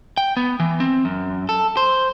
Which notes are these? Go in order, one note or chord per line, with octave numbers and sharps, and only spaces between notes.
G5
B3
E3
C4
F#2
A4
C5